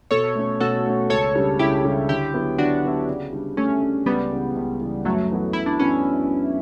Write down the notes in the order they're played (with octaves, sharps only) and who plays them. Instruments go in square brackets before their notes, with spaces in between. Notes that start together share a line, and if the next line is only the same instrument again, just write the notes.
[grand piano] B2 [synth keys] A4 C#5
[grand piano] A3 C#4
[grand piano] B2 [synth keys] F#4 A4
[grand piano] A3 C#4
[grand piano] C#2 [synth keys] A4 C#5
[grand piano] C#3 G3 D4
[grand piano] C#2 [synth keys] E4 G4
[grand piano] C#3 G3 D4
[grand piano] D3 [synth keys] E4 G4
[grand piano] F#3 B3 E4
[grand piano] D3 [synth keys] D4 F#4
[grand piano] F#3 B3 E4
C#3
G3 D4
[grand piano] C#3 [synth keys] A3 C#4
[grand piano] G3 D4
[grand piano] C#2 [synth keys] G3 B3
[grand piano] C#3 E3
C#2
C#3 E3
[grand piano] F#2 [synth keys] F#3 A3
[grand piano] E3 B3 F#4
[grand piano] F#2 [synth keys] E4
[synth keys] D4
[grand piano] E3 B3 F#4 [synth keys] C#4